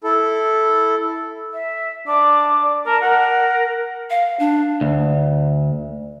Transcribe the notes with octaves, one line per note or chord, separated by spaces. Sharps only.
E4 A4
E5
D4 D6
D5
A#4 A5
A#4 F#5
F5
D4
D2